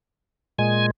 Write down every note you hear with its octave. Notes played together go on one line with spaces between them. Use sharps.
A#2 G#3 G#5